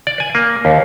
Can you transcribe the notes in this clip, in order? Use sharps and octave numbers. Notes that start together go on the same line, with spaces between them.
D5
G#5
A#3
D#2